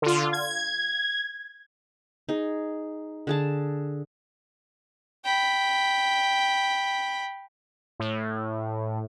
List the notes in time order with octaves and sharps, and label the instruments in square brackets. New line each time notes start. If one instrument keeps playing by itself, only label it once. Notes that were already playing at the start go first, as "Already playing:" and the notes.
[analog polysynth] D3 F4
G#6
[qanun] D#4 G#4
D3 G#4 A5
[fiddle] G5 B5
[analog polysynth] A2